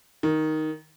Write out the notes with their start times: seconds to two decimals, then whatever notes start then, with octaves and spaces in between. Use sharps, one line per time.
0.23 D#3